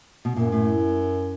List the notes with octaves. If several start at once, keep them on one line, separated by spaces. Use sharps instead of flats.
B2
F#2 A#2
A2